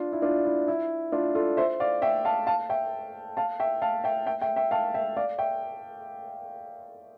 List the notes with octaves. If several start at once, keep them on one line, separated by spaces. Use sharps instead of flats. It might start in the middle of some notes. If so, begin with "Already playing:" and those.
Already playing: D4 F4
E4
D4 F4
E4
E4
D4 F4
F4 A4
C5 E5
D5 F5
E5 G5
F5 A5
F5 A5
E5 G5
F5 A5
E5 G5
F5 A5
E5 G5
E5 G5
E5 G5
E5 G5
F5 A5
E5 G5
D5 F5
E5 G5